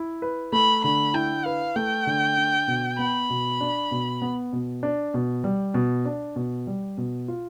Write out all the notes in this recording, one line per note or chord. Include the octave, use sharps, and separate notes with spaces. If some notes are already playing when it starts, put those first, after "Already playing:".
Already playing: E4
B4
A3 B5
D3 B5
E4 G5
B4 F5
A3 G5
D3
D4
B2
B3 B5
B2
D4
B2
B3
B2
D4
B2
G3
B2
D4
B2
G3
B2
F4